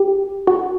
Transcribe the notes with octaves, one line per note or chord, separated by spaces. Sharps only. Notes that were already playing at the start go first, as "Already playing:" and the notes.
Already playing: G4
F#4